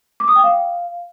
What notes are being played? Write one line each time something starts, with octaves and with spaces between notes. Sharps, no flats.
D6
D#6
G5
F5